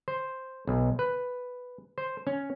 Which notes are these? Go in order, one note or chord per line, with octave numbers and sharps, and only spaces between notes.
C5
B1
B4
C5
C#4